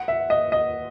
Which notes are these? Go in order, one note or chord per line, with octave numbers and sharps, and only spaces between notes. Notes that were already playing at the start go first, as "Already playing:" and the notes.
Already playing: F#5
E5
D#5
D#5